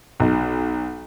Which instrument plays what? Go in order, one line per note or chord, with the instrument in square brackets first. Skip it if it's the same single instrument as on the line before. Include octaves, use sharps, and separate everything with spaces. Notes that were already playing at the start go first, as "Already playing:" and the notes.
[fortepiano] B1